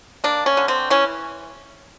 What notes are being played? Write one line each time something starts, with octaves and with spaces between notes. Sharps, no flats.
A#3 D4
C#4
D3
C4
E3 C#4